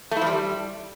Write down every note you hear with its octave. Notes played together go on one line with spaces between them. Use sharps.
A3
E4
F3
G3